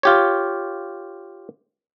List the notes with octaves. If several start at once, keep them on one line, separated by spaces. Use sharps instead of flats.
F4 G4 C#5